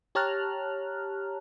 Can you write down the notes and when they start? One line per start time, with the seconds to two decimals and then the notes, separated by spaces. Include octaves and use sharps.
0.15 G4 C#5 A5 A#5 F6 F#6